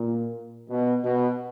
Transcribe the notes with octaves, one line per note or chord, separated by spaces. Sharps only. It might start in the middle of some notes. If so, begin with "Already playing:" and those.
Already playing: A#2
B2
B2